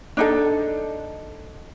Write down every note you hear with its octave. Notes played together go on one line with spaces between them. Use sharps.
D4 D#4 A4